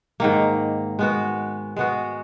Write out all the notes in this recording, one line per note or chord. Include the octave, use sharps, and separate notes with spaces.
G#2 D#3 A#3
G#3 B3 F#4
G#3 B3 F#4